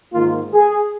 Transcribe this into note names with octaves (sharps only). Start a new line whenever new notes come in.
G#2 D#3 A#3 F4
G#4